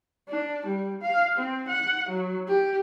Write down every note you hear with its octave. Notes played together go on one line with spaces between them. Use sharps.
D4
G3
F5
C4
F#5
F#3
G4